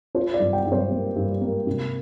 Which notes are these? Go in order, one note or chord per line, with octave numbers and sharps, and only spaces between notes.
F4 C5
D5
G2
G5
G2
C5
A#3
G2
A#3
C3